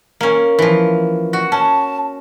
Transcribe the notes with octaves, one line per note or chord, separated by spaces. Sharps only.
A#3 C#4
E3 F3
F#4
C#4 A5